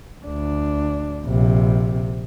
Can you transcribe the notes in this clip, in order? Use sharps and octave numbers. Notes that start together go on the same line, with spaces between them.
D2 D4
A#1 C3